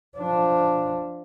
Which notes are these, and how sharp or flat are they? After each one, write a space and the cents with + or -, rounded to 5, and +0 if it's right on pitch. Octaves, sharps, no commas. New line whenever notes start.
F3 +0 D4 +0